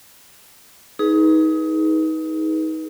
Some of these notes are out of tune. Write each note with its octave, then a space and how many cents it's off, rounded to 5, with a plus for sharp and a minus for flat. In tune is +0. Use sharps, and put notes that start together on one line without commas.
D#4 +25 G#4 +15 B4 -15